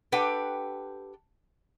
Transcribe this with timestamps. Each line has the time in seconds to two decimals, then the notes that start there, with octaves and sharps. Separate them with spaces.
0.12 D4 G4 A4 B4 F#5 G5